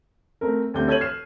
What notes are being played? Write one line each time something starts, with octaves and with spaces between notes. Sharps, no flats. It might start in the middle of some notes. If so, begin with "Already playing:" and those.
A3 C4 A#4
D2 G3 C4 G6
A4 C#5 G6 G#6 D#7 F#7
F6 C7 E7